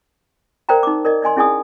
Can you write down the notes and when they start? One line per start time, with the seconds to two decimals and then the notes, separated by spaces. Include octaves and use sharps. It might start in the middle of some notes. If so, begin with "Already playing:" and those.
0.69 A#4 C5 D5 F5 G5 A#5
0.83 D#4 D6
1.05 A#4 D5 D#5
1.22 D5 D#5 G#5 C6
1.37 C#4 E4 G#4 D5 G#5 D#6